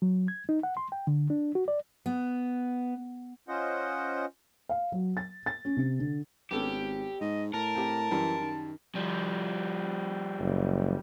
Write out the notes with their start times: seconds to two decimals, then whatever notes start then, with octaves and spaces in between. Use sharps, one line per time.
0.02 F#3
0.28 G#6
0.49 D#4
0.63 F#5
0.77 C6
0.92 G5
1.07 D3
1.30 D4
1.55 F#4
1.68 D5
2.06 B3
3.48 C#4 F4 C5 D#5 F#5
4.69 F5
4.92 F#3
5.17 A6
5.46 A6
5.65 C#4
5.77 C3
5.99 D3
6.51 G#1 B3 C#4 G4 A4
7.21 G#2 D#5
7.54 A2 A#4 A5
7.75 C4 G4
8.11 F#2 E3 G3
8.41 D#3
8.95 F3 G3
10.40 F#1